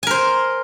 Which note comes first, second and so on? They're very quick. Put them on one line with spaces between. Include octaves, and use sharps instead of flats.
G#5 A#4 C5